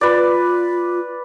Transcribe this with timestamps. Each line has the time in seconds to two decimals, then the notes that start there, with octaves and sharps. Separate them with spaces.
0.01 F4 B4 D5